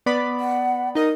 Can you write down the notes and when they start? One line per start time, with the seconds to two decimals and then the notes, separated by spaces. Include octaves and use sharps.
0.06 B3 D5 B5
0.40 F#5
0.95 D#4 A#4 D#5